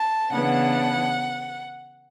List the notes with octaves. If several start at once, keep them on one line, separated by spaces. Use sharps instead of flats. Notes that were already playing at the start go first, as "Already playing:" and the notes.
Already playing: A5
C#3 E3 B3 D4 F#5